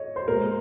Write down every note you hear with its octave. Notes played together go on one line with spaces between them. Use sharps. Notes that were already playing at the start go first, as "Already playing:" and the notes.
Already playing: C#5 D#5
C5
A#2 G#3 A#4